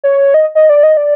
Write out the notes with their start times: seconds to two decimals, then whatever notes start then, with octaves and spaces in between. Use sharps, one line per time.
0.04 C#5
0.34 D#5
0.55 D#5
0.69 D5
0.83 D#5
0.97 D5